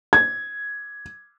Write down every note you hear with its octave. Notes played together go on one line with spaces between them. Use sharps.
G#6